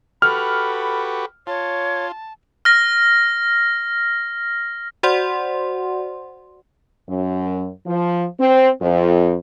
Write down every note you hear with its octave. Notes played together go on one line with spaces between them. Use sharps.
F#4 G4 A4 B4 B5 F6
F4 C#5 A5
F6 A#6
F#4 C5 D5 F#5 C6
F#2
F3
C4
F2